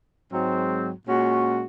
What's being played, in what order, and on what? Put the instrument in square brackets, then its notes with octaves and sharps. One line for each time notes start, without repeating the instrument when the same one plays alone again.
[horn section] G#2 F#3 C4
A#2 G#3 C#4 F#4